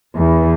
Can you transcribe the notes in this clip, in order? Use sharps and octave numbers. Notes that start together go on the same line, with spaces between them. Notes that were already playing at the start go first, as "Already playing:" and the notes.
E2